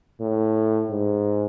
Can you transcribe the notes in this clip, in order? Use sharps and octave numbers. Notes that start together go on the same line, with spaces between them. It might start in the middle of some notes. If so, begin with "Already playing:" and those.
A2
G#2